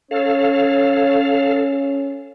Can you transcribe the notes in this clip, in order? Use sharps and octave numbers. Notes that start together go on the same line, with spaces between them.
C#4 A4 C#5 F5